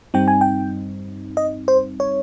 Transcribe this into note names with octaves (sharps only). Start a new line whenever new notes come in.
G2 G3 C4 D#4 G5
G#5
G5
D#5
C5
C#5